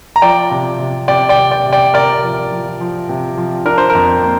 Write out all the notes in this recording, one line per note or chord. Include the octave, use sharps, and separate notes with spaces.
A#5
F3 D5 G5
C3
C3
C3 D5 G5
D5 G5
C3
D5 G5
C3
D5 G5
C3 A#4 D5
F3
F3
F3
C3
F3
D4 A#4
C5
A#4
F2
A#3